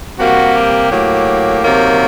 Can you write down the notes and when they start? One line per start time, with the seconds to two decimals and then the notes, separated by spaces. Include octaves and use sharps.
0.18 C3 G3 A#3 F#4
0.55 G4
0.91 A2 F#3 A#3
1.64 C3 D#3 F#3 A#3